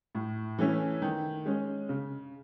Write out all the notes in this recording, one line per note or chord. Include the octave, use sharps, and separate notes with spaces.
A2
E3 A3 C#4 E4
D#3
G#3 C#4
C#3